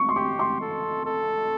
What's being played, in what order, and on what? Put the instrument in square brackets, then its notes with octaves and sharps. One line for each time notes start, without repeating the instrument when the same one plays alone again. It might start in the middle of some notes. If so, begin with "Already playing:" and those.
Already playing: [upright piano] C#6
C6
[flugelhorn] G4 [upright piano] C#6
[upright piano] C6
[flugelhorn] A4
A4